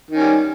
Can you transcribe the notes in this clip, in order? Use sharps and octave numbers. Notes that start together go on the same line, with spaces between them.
D#3 G3 C#4